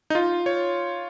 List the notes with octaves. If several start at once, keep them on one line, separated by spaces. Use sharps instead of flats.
D#4
F4
C#5